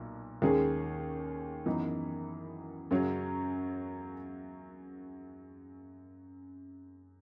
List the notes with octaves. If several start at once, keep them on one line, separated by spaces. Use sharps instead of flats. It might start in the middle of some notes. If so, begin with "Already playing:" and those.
Already playing: B1 A#2
D#2 D#3 G#3 C#4 G#4
F#2 E3 B3 D#4
F#2 C#3 F#3 C#4